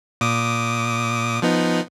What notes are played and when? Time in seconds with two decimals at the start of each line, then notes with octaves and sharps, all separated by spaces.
0.21 A#2 D6 D#6
1.42 F3 B3 D#4